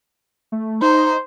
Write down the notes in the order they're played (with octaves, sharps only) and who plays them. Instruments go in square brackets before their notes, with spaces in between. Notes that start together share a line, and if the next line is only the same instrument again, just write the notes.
[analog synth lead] A3
[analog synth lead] D#4 [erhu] C5